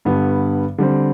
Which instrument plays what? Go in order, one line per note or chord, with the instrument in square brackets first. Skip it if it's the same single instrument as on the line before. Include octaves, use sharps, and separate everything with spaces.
[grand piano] G2 D3 G3 B3
D3 G3 C4